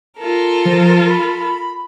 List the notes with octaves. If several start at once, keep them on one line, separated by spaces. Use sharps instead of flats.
F4 A4 A#4
F3
B5